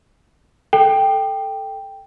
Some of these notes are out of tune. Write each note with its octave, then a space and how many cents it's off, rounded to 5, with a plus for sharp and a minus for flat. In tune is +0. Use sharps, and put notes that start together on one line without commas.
A4 +0 G5 +0